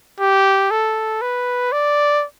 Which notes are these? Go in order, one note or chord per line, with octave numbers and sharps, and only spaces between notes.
G4
A4
B4
D5